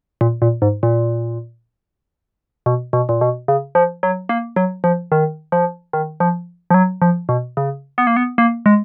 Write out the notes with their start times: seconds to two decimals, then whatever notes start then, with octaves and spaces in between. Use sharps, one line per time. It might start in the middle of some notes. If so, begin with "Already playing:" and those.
0.21 A#2
0.42 A#2
0.62 G#2
0.83 A#2
2.66 B2
2.93 B2
3.09 A#2
3.21 B2
3.48 C#3
3.75 F3
4.03 F#3
4.29 A#3
4.56 F#3
4.84 F3
5.12 D#3
5.52 F3
5.93 D#3
6.20 F3
6.70 F3
6.74 F#3
7.02 F3
7.29 B2
7.57 C#3
7.98 B3
8.07 A#3
8.16 B3
8.38 A#3
8.66 G#3